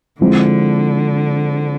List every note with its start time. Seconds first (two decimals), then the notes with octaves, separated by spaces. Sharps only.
0.21 D3 F3 G#3 C4 E4